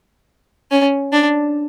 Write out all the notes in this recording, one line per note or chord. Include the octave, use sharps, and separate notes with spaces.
C#4
D4